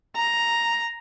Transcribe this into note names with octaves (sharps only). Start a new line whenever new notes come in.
A#5